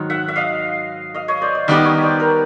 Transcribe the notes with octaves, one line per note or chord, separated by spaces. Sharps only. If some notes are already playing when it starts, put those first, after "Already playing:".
Already playing: G#2 D#3 F#3
E5 F#5
E5
D#5 F5
D#5 F5
C#5 D#5
C5 D5
C#5 D#5
D#3 G3 B3 D#4 G4 D5 E5
C#5 D#5
C5 D5
A#4 C5